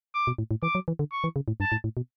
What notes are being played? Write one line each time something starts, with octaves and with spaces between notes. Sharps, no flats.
D6
B2
A2
A2
E3 D6
F#3
E3
D3
C#6
E3
C#3
A2
G2 A5
A2
A2
B2